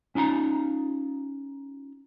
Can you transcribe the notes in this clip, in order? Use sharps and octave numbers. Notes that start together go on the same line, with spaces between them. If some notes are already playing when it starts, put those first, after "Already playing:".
C#4 D#4 F4 A5 A#5